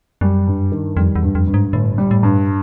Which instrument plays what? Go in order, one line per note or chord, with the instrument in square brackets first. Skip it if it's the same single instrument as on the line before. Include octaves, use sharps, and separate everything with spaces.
[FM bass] F#2 [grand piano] G3
[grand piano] G2
D#3
[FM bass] F2 [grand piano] G3
[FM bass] E2
[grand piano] G2
[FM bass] F2
[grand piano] G2
[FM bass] G#2
[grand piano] G1 [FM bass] A2
[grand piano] G3
[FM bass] A2
[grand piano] G2